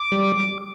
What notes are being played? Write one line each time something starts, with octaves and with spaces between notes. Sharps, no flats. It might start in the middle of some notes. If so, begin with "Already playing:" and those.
Already playing: D6
G3